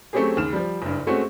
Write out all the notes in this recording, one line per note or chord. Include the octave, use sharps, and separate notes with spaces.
F#3 A3 C4 C#4 G4 G#4
D#2 C#3 F6 E7
F3 G3
F#1 G2
G#3 A3 C4 C#4 F#4